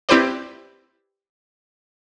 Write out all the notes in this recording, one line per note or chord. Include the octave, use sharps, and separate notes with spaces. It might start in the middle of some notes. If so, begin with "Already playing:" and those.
C4 E4 G4 B4 C5 D5